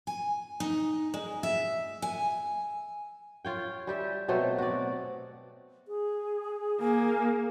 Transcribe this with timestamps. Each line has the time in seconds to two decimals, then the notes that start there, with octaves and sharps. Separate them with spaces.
0.07 G#5
0.60 D#4
1.14 G#3
1.43 E5
2.02 G#5
3.45 F4 C#5 G5
3.87 G3 G4 E5
4.28 B2 F#3 A3 C4
4.58 F#4 D5
5.88 G#4
6.81 A#3 G#5